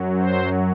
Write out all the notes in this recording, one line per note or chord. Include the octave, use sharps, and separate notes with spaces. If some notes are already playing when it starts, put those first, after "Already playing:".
Already playing: F#2 F#3
C5